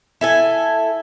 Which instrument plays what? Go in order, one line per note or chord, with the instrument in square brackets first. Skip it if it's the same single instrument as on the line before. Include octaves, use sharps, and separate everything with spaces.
[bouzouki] E4 A4 G#5